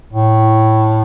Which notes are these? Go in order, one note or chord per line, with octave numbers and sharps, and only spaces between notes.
A2